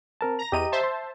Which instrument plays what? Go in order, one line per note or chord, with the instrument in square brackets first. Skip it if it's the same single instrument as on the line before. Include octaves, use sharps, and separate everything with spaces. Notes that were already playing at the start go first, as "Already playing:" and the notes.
[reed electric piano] C4 A#4 A5
[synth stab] A#5 A#6
[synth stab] E2 D#7 [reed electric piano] G4 D#5 A#5
[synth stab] C5 E5 A5
[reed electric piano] C6